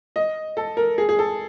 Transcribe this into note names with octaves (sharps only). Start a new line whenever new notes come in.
D#5
A4
A#4
G#4
G#4
A4